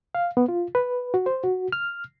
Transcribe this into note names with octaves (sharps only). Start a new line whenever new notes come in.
F5
B3
F4
B4
F#4
C5
F#4
F6